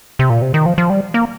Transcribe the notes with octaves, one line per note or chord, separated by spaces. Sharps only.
C3
A#2
C3
D#3
F3
F3
G3
A#3